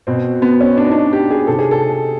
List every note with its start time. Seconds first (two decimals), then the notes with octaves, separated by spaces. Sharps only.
0.07 B2 C4
0.42 B3
0.61 C#4
0.78 D4
0.85 D#4
0.92 D4
1.13 G4
1.31 G#4
1.47 C3 D#3 A4
1.59 G#4
1.71 A4